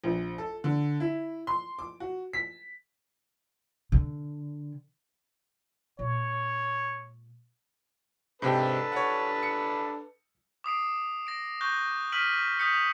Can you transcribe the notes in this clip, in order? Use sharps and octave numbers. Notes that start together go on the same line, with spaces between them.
A#1
A4
D3
E4
C6
D6
F#4
B6
D3
A#2 G#3 C#5
G#2 C3 D4 A4 B4 G5
C#5 F#5
C#7
D6 D#6 C7 D7
A#6 D7
C#6 F#6 G6 A#6 G7
D6 F6 B6 D7 D#7 F#7
D#6 G6 B6 C#7
D#6